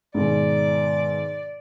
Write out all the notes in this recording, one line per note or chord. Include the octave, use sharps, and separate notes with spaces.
G#2 B2 D#3 D5